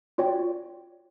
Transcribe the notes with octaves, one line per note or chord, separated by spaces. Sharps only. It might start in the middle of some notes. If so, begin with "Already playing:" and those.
F4 F#4 C#5 D5 G5